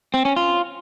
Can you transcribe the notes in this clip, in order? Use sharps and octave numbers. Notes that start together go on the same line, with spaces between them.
C4
C#4
F4